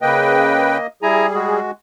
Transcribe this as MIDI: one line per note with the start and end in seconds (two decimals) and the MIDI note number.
0.02 0.78 49
0.02 0.87 58
0.02 0.78 71
0.02 0.87 75
0.02 0.78 79
1.03 1.60 55
1.03 1.27 64
1.03 1.60 68
1.03 1.27 80
1.03 1.27 82
1.35 1.71 56
1.35 1.71 66